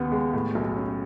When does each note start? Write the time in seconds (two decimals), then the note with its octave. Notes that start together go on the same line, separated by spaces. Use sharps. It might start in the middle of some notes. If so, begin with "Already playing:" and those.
Already playing: D#2 C#3 B3
0.12 G#3
0.33 A2
0.55 B1
0.76 C#4